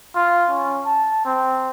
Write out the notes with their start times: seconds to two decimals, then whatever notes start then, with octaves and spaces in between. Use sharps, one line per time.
0.15 F4
0.50 C#4
0.85 A5
1.25 C4